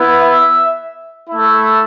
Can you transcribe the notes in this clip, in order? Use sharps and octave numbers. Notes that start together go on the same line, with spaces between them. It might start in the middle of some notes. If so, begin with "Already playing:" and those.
Already playing: B3 E4
E5
A3 E4